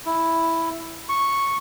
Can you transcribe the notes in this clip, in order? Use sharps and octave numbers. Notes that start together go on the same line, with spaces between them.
E4
C#6